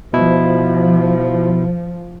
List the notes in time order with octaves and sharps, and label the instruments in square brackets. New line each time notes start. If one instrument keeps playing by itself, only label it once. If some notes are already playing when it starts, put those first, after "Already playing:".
[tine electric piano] B2 E4 [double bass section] F3